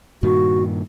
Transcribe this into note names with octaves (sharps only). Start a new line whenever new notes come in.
G2 A#2 D#3 F#4